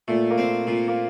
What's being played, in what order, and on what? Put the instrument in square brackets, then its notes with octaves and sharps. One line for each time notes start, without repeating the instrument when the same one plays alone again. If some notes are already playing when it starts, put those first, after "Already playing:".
[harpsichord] A#2 [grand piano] A3
[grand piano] A#3
[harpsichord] C4
A#2
[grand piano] A#3